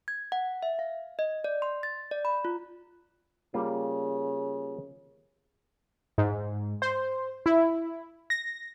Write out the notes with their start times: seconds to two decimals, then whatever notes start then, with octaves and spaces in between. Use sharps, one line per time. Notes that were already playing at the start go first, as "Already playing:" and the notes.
0.08 G#6
0.32 F#5
0.63 E5
0.79 F5
1.19 D#5
1.44 D5
1.62 C6
1.83 A6
2.11 D5
2.25 B5
2.45 F4
3.54 C#3 G3 A#3 F4
6.18 G#2
6.82 C5
7.46 E4
8.30 A#6